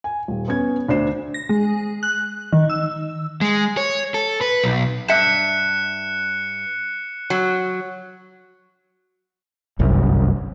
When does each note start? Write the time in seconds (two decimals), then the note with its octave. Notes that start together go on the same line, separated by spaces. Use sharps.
0.04 G#5
0.28 D#1
0.48 B3 C#4 G#6
0.89 D2 D4 C5 C7 E7
1.34 A#6
1.49 G#3
2.03 F#6
2.52 D#3
2.70 E6
3.41 G#3
3.77 C#5
4.14 A4
4.41 B4
4.64 B1
5.08 G2 E5 F#6 C#7 E7
7.30 F#3
9.79 G1 C2 F#2